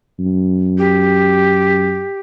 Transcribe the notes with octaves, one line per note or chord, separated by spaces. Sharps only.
F#2
G4